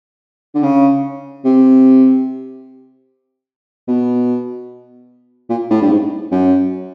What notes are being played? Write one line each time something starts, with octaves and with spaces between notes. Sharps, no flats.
D3
C#3
C3
B2
A#2
A2
G2
G#2
F#2